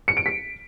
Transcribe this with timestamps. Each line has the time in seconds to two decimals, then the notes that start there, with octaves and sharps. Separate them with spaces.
0.08 C#7
0.17 D7
0.26 B6